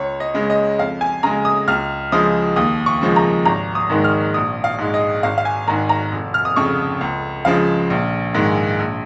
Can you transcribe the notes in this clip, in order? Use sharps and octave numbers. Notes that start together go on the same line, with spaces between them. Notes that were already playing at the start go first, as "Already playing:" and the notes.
Already playing: C#2 C#5
D#5
C#3 G#3
D#5
F2 F5
G#5
C#3 G#3 A#5
D#6
C#2 F6
C#3 F3 G#3 D#6
D#2 D#6
C#6
C#3 F3 G#3
A#5
G#1 A#5
D#6
G#2 D#3 G#3
F6
A#1 D#6
F5
G#2 G#3
D#5
G#1 F5
F5
G#5
G#2 D#3 A#5
A#5
F1
F6
D#6
F2 C#3 C#6
C#2
C#3 F3 G#3 F5
A#1
G#2 D#3 G#3
A#1